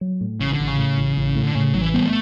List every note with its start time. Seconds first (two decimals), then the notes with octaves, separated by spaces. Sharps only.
0.01 F#3
0.21 A2
0.40 A1 C#3
0.53 D3
0.60 A1
0.67 C#3
0.78 A2
0.97 A1
1.17 A1
1.36 A2
1.43 D3
1.55 A2 C#3
1.74 A1 F#3
1.81 E3
1.94 G3 B3
2.06 A3